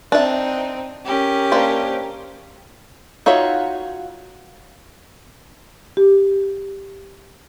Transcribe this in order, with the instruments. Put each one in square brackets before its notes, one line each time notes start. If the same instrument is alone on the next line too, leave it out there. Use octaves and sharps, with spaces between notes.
[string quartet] C4 D#4 [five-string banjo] D4 E5
[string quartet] C#4 G4 A#4
[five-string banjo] A#3 D4 C5
D#4 F4 F#4 C#5 E5
[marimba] G4